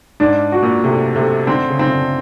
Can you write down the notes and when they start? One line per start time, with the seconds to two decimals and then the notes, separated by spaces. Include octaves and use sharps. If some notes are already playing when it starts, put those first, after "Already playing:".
0.20 G#2 D4
0.52 F#4
0.63 A#2
0.84 C3 A3
1.16 C3 A3
1.47 D3 C4
1.69 C#3
1.79 C4
1.90 D3